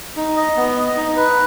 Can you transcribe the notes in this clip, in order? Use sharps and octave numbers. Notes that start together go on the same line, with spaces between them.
D#4
D#5
B3
D#5
D#4
B4